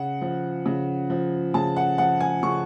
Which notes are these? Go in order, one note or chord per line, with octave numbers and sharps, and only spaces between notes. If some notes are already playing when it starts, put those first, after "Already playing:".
Already playing: C#3 F#5
F3
C#3
F3
C#3 A5
F#5
F3 F#5
G#5
C#3 C#6